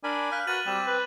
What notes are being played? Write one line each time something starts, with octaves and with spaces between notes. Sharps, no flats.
D4 A#4 G#5 B5
F5 F#6 G6 B6
F#4 A#4 B4 A6 D#7 F#7
G3 C4 D6 E7
B4